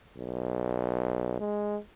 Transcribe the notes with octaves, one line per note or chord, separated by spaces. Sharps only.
B1
G#3